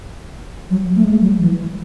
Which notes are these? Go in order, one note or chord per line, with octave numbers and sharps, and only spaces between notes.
F#3
A3
G#3
F#3
E3